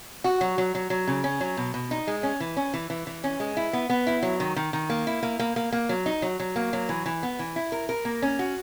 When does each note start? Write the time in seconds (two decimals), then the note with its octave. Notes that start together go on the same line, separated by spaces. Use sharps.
0.24 F#4
0.41 F#3
0.58 F#3
0.75 F#3
0.90 F#3
1.07 C#3
1.24 C#4
1.41 F#3
1.57 B2
1.74 B2
1.91 D#4
2.07 G#3
2.23 C#4
2.40 E3
2.57 C#4
2.74 E3
2.90 E3
3.07 E3
3.24 C#4
3.40 G#3
3.57 E4
3.73 B3
3.90 B3
4.07 E4
4.22 F#3
4.40 D#3
4.56 D#3
4.73 D#3
4.90 A#3
5.07 E4
5.23 A#3
5.39 A#3
5.56 A#3
5.72 A#3
5.89 F#3
6.06 D#4
6.22 F#3
6.40 F#3
6.56 A#3
6.73 F#3
6.89 E3
7.06 E3
7.23 B3
7.39 E3
7.56 E4
7.72 A#4
7.89 A#4
8.05 A#3
8.22 C#4
8.39 F#4